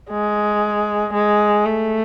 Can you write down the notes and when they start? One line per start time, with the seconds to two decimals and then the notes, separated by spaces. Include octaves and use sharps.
0.10 G#3
1.13 G#3
1.65 A3